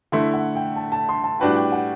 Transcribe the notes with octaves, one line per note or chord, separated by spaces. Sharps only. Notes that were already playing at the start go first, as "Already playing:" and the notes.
D3 A3 E4 C6
F#5
G5
A5
A5
C6
A5
A2 G3 D4 F#4 B4 G5
G5
F#5